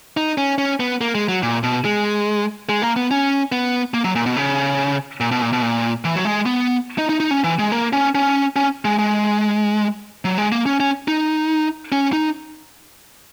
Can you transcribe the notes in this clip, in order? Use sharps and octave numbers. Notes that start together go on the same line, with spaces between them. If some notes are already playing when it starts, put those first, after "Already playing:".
D#4
C#4
C#4
B3
A#3
G#3
F#3
A#2
B2
G#3
G#3
A#3
B3
C#4
B3
A#3
F#3
A#2
B2
C#3
A#2
B2
A#2
B2
A#2
E3
F#3
G#3
B3
D#4
D#4
D#4
C#4
E3
G#3
A#3
C#4
C#4
C#4
G#3
G#3
F#3
G#3
A#3
C#4
C#4
D#4
C#4
D#4